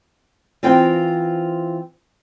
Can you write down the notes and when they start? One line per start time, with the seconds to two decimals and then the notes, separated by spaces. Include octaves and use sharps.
0.63 E3 C4 F4 G5